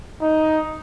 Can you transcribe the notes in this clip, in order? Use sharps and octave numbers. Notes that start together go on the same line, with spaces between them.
D#4